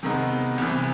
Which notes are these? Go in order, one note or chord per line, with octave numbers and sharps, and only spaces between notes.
C3 D#3 G#3 B3 D#4
C2 C3 E3